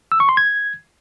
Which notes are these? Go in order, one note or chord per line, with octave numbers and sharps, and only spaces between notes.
E6
C#6
C6
G#6